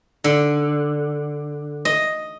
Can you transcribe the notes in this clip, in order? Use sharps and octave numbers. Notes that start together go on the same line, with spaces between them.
D3
D#5